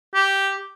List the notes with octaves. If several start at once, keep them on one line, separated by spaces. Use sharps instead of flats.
G4